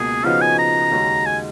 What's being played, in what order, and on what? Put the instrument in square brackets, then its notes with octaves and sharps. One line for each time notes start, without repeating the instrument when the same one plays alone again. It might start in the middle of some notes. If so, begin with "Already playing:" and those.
Already playing: [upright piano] C#2 B2 A#3 [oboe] G#4
[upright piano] C#3 F3 B3 D#4 F#4 [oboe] F5
[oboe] G#5
A#5
[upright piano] D#2 C#3 G#3 D#4 F#4
[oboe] G#5